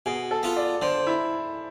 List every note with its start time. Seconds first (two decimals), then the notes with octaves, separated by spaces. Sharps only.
0.06 B2 G#4
0.31 A4
0.43 B3 F4
0.57 D5
0.82 D3 C5
1.07 E4